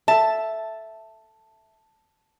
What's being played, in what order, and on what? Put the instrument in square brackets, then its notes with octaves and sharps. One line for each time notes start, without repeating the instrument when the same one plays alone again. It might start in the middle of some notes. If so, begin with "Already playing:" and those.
[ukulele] A4 E5 [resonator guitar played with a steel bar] A5